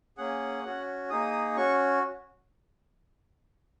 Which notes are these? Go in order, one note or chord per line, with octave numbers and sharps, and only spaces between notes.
A#3 C#4 G#4 F#5
C#4 F#4
A#3 D#4 G#4 D#6
C#4 F#4 C#6